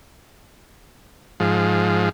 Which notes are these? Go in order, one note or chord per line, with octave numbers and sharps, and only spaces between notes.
G#2 F3